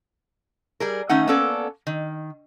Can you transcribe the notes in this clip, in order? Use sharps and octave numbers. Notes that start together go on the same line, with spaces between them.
G3 G#4 A#4
D#3 A3 C#4 D#4 F#5
A#3 B3 C#4 A4 D5
D#3